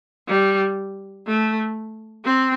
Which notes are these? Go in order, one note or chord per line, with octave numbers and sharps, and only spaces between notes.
G3
A3
C4